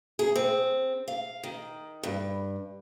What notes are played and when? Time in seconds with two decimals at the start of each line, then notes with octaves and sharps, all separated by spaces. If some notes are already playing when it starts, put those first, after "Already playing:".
0.19 G#4
0.36 C4
1.08 F5
1.43 D#3
2.03 G2